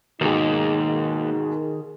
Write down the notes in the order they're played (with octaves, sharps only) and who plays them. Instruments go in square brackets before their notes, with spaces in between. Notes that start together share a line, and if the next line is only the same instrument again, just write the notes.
[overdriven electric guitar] D#2 [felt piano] G#2 B2 [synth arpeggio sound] D#3 G#4 [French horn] D#4